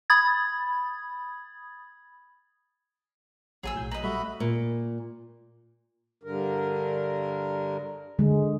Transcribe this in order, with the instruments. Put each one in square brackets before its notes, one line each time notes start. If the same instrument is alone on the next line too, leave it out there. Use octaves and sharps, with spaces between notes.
[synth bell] B5 D#6 G#6 A6
[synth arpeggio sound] A#1 F#3 [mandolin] G#4 G#5 E6
[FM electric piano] B1 A2 G6
[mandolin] B4 D#5 [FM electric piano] A#5
[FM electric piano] G3 A3 [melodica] F#4 E5 B5
[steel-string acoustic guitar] A#2
[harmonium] G2 D3 A#4
[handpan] D3 G#3